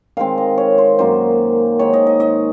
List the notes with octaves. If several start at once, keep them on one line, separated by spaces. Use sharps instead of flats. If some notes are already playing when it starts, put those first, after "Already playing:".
D#3 G#3 C4 F5
D#5
C#5
C5
F#2 D#3 F#3 A#3 C5
D#3 G#3 D#4 C#5
D#5
D#5
D#5